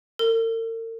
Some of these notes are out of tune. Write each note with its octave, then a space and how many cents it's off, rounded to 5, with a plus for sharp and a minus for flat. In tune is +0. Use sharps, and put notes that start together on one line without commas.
A#4 -45